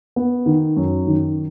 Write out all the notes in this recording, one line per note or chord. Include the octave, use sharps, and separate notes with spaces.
B3
D#3
F#2
D#3